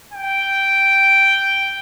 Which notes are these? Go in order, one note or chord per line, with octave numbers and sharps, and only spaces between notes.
G5